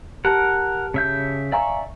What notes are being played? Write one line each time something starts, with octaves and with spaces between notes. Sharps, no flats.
G4 A#4 F#5 A5
C#3 E5 G6
D5 E5 F5 G#5 A#5 C#6